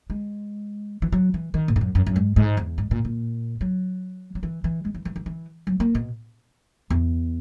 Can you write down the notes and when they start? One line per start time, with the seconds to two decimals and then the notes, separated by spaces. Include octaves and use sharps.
0.10 G#3
1.02 E3
1.12 F#3
1.34 E3
1.54 D#3
1.68 A#2
1.76 G#2
1.81 F#2
1.95 F#2
2.07 F#2
2.16 G#2
2.36 G#2
2.57 E2
2.78 G#2
2.91 A#2
3.05 A#2
3.61 F#3
4.35 F#3
4.43 E3
4.64 E3
4.85 G#3
4.94 E3
5.05 E3
5.16 E3
5.26 E3
5.67 F#3
5.80 A#3
5.95 B2
6.90 E2